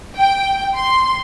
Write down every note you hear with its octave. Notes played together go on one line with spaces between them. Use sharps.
G5
C6